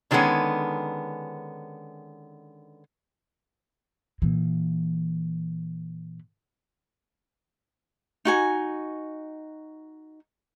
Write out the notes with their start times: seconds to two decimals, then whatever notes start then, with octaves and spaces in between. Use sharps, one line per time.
0.11 D3 D#3 G3 G#3 B3 C#4
4.22 A#2 E3
8.25 D#4 F#4 G#5